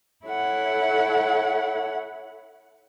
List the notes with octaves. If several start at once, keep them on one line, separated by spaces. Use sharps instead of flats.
E4 A4 C#5 F#5